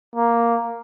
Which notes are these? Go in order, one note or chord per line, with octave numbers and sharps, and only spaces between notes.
A#3